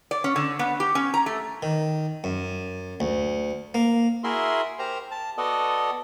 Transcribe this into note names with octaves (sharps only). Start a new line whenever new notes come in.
D5
C#4
D3
B3
G4
C#4
A#5
A3
D#3
F#2
D2
A#3
E4 F#4 G#4 A#4 E5 C6
G4 A#4 C5 A#5
A5
B3 F#4 A4 D5 D#5